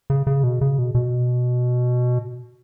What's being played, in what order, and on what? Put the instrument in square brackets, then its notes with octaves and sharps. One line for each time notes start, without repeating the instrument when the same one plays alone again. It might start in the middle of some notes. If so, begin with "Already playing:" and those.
[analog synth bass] C#3
C#3
B2
C#3
B2
B2